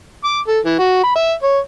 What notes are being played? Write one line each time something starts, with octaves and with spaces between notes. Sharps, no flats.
D6
A4
E3
F#4
B5
E5
C#5